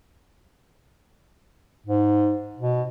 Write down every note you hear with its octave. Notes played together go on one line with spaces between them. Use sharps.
G#2
B2